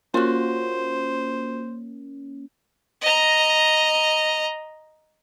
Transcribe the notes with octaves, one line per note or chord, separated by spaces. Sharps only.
A#3 C#4 F4 F#4 C5
D#5 A#5